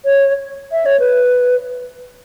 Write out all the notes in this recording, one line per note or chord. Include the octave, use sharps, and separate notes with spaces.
C#5
E5
C#5
B4